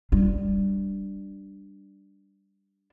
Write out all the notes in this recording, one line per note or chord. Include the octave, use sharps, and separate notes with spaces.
G3 D4